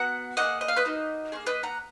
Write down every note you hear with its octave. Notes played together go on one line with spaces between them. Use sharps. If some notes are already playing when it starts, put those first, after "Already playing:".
Already playing: B3 F#4 F#5 A#5
A#3 D#4 G#4 D#5 F#5
D#5
F5
B4 D#5
A#3 D#4 F#4
A#3 C#4 G#4
B4 D#5
F#5 A#5